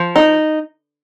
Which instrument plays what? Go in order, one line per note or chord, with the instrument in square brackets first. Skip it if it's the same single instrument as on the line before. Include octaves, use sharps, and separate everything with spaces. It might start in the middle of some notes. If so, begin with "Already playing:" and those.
Already playing: [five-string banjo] F3
D#4